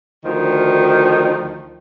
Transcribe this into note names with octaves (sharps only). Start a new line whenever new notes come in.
D2 D#3 F3